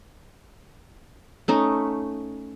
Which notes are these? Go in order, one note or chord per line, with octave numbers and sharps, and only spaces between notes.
A3 C#4 D#4